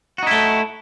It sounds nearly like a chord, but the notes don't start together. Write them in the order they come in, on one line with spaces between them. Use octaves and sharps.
F#4 D#4 E4 A3